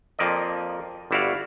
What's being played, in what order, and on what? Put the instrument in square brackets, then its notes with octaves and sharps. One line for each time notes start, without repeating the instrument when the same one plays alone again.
[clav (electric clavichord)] F2 F3 A#3 D5 D#5
G1 G3 E4 F#4 D5 F5